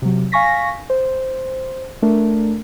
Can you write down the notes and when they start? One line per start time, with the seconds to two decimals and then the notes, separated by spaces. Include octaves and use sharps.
0.02 C3 F#3
0.32 F5 G#5 C#6 A#6 B6
0.90 C5
2.02 A3 D4 A#4